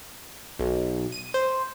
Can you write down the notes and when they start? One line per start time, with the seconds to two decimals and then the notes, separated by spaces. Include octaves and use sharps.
0.59 B1
1.12 D#7
1.34 C5